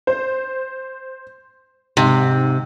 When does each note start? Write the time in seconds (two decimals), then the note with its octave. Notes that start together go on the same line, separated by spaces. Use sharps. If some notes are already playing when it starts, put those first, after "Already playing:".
0.07 C5
1.97 G#2 C3